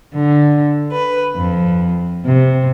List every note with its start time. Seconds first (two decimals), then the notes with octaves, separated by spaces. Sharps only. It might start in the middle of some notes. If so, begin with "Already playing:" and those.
0.14 D3
0.92 B4
1.35 F2
2.24 C3